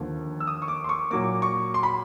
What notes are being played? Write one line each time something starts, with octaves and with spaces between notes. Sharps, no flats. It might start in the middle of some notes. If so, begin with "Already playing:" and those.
Already playing: D#2 D3 F3
E6
D#6
C#6
D6
C6
C#6
A#2 F#3 A#3 D6
C#6
C6
B5